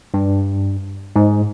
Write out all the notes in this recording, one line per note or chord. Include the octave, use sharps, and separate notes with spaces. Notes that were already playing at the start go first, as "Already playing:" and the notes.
G2
G#2